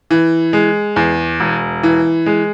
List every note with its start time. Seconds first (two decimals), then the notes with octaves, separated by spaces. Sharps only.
0.11 E3
0.53 G#3
0.96 E2
1.40 E1
1.83 E3
2.26 G#3